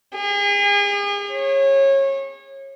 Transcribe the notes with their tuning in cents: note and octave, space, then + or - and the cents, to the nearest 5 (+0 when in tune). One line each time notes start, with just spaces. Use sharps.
G#4 -40
C#5 -25